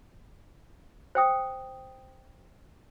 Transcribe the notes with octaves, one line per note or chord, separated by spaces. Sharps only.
C5 G5 D#6